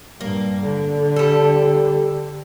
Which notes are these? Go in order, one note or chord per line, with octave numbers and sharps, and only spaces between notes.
G2 A#3
D3
G3 A4